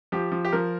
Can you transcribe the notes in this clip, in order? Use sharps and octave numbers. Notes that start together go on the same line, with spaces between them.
F3 G4
F3
G4
F3 A#4